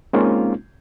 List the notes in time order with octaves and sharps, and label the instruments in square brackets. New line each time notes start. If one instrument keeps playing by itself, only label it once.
[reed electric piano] G#3 A#3 C4 C#4 D#4 F4